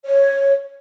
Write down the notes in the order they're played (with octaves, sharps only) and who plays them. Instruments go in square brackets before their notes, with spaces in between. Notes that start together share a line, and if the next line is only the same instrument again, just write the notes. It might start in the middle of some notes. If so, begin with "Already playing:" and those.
[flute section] C#5